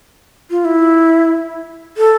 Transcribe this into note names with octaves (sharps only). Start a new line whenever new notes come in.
F4
E4
A4